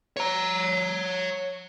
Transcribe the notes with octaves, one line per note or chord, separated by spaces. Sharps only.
C#5 A#5